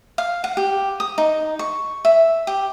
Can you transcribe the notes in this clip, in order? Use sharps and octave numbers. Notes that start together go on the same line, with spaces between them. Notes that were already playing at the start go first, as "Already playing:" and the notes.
F5
F#5
G4
D#6
D#4
C#6
E5
G4